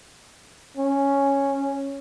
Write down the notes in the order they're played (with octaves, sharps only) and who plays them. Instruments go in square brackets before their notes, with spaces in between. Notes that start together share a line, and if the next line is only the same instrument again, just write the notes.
[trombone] C#4